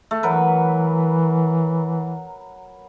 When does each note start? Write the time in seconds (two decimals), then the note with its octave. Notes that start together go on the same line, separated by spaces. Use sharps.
0.11 A3
0.23 E3 F#3 A#4 B4